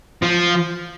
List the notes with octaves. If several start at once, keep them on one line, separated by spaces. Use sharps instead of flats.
F3